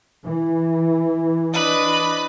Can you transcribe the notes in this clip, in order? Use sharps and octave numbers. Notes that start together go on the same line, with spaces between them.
E3
D4 B4 D#5 B5